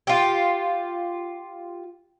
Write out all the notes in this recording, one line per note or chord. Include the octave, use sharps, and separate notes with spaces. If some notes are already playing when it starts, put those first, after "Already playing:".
F4 G4